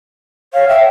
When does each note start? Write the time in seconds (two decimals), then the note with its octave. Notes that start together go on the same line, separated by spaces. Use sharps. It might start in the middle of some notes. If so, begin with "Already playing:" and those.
0.54 C#5 F5
0.68 E5 G5